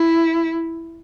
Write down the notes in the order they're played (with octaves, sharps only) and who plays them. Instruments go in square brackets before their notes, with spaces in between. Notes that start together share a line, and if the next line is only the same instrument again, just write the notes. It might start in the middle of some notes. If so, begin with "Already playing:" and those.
Already playing: [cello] E4